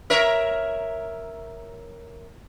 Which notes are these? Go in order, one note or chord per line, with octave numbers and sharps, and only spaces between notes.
A#4 C#5 E5